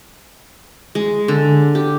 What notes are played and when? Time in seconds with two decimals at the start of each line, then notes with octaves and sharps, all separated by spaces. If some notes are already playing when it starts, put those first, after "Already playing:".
0.95 G#3
1.28 D3
1.75 G4